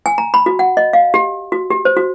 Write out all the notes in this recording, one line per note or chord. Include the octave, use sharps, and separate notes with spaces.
G#5
A#5
B5
F#4
F#5
D#5
F5
G4
F#4
G4
C5
F#4